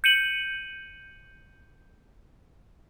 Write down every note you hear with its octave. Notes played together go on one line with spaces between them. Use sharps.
G6 C#7 D#7 F#7